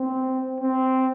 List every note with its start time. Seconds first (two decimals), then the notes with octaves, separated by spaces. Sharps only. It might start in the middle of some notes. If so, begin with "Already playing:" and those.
Already playing: C4
0.60 C4